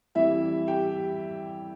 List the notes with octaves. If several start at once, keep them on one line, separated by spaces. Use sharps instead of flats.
F2 E3 G3 E4 E5
G4 G5